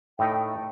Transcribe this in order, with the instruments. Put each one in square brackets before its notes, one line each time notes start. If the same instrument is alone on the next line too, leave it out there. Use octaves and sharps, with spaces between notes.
[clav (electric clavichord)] A2 A3 D#4 [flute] G5